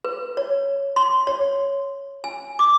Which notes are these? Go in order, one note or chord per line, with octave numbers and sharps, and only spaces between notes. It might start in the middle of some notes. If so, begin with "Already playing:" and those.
B4
C#5
C6
C#5
G#5
D6